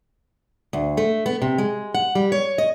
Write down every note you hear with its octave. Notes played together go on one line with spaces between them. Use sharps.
D2
A3
B3
C3
G#3
F#5
G3
C#5
D#5